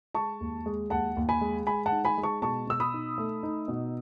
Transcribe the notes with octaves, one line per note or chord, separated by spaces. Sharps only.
G#3 A5 C#6
D#2
G#3
D#2 F#5 A5
D#2
G#5 B5
G#3
G#3 G#5 B5
F#5 A5
D#4
G#5 B5
G#3
A5 C#6
B2 A5 C#6
B2 E6
B5 D#6
D#4
A3
D#4
B2